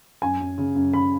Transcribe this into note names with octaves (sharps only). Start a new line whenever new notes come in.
F#2 G#5
F#2
C#3
F#2
C#3 B5